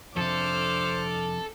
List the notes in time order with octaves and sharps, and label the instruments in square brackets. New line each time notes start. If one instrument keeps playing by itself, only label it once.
[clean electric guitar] F2 C3 [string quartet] D4 D6 F6 [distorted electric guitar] A4 [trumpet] C5